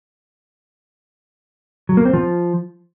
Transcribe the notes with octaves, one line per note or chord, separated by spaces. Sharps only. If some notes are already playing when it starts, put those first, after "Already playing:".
F#3
A#3
C4
F3